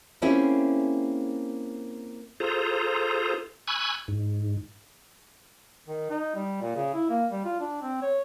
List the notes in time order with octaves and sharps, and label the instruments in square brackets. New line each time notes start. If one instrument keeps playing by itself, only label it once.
[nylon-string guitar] A#3 C4 C#4 E4 G4 G#4
[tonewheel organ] F4 G#4 A4 C5 A#5
G#5 B5 C#6 E6 F#6 G#6
G#2
[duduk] D#3
D#4
G3
A#2
C#3
E4
A#3
G3
F4
D4
C4
C#5